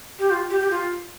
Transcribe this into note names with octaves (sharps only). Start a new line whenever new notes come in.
G4
F4
G4
G4
F4